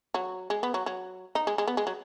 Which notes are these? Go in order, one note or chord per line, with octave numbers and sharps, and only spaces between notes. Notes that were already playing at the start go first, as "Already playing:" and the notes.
F#3
G#3
B3
F#3
F#3
D#4
G#3
G#3
B3
G#3
F#3